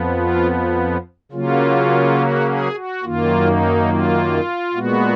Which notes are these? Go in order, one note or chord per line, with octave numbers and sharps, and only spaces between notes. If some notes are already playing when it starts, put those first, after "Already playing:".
Already playing: F2 F3 B3
F4
C#3 F#3 A#3 C#4 F4
F#4
G#4
F#4
F#2 D#3 A#3 F4
D#4
F4
A#2 G#3 B3 F#4